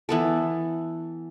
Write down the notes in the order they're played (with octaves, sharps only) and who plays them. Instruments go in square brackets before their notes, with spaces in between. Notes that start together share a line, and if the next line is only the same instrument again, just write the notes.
[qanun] E3 B3 A4